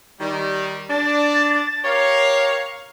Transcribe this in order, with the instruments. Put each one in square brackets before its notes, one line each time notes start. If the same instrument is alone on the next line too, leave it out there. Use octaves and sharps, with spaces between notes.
[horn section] D#3 G3
[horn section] D4 [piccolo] A6
[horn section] G4 A#4 C#5 [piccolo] F5